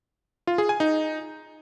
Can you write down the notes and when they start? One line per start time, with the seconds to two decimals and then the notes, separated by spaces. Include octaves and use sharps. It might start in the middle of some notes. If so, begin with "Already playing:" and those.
0.47 F4
0.58 G#4
0.69 G#5
0.80 D#4